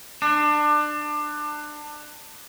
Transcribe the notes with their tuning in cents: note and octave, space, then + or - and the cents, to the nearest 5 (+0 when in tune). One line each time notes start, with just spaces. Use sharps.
D4 +25